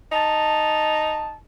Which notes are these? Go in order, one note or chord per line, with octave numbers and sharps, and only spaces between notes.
D#4 A5